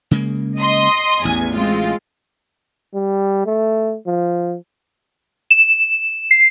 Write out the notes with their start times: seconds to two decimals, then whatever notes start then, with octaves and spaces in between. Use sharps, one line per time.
0.11 C#3 G#3 A#3
0.59 D#5 C6 D#6
1.25 A1 E2 G#5
1.55 G#3 C4 F4
2.94 G3
3.46 A3
4.07 F3
5.51 E7
6.31 C7